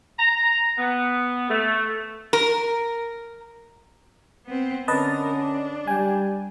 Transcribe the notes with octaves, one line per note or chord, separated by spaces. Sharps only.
A#5
B3
A3
A#4
B3 C4
D3 C#4 A#4 B4 D#5 A5
D4
G3 G5 G#5